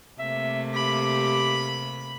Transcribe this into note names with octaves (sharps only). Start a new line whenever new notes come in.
C3 A3 A#3 E5
G4 B5